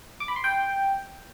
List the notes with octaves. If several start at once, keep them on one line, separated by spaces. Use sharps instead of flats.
D6
B5
C6
G5